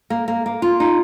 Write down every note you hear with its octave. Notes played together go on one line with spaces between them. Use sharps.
A#3
A#3
A#3
F4
D#4